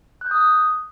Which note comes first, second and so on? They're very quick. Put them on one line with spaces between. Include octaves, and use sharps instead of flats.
F#6 G6 D#6